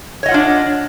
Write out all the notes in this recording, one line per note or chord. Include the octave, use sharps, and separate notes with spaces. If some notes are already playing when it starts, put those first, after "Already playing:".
D4 F4 C#5 D#5 F#5